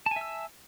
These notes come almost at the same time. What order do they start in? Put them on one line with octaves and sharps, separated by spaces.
A5 G#5 E5 E6